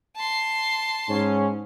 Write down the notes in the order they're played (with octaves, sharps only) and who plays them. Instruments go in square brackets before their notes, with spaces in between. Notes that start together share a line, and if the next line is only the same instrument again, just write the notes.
[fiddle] A5 C6
[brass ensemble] G#2 C#4